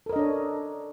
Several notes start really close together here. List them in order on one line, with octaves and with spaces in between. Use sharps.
A4 A#4 D#5 D4 C#5